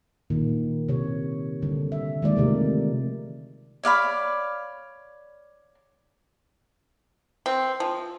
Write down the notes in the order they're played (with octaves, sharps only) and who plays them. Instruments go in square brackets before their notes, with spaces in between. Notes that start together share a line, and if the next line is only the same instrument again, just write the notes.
[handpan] A#2 D#3 A#3
C3 C#5
D3 G3 D4 A4
E5
D#3 F3 G#3 A#3 D5
C3 A3 A#4
[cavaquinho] C#5 D5 F5 B5
[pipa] C4
F3